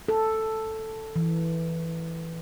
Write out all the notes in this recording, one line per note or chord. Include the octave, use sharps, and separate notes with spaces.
A4
E3